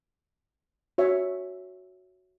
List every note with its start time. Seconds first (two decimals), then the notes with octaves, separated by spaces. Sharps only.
0.98 F#4 C#5 E5